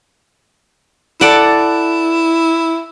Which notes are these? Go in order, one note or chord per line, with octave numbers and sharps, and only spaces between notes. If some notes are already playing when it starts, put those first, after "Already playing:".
E4 A4 D5 F#5